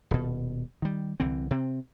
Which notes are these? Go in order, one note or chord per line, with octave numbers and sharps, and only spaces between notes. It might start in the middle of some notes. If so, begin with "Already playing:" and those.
D#1 B2
D#3 G3
C2 D3 E3 C4
C3 C4